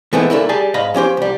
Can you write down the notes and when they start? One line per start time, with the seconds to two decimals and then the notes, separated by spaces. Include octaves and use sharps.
0.13 E3 G#3 A3 B3 C4 E4
0.30 D3 A3 A#3 E4
0.49 G3 G#4 A5
0.74 G#2 D#5 F5 B5
0.94 F3 C#4 G4 C5
1.17 C2 G3